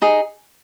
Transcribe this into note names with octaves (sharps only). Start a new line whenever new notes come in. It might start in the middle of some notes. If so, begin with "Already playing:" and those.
D#4 G#4